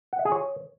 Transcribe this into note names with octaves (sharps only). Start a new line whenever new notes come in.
F#5
E5
G#4
C#5